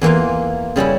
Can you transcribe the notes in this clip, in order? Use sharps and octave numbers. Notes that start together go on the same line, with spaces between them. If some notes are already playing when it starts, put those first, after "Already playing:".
E2 E3 A#3 F4
C#3 G3 C#4 E4